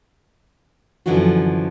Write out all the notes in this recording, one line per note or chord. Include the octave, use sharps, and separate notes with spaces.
F#2 D3 E3 F3 D4 F#4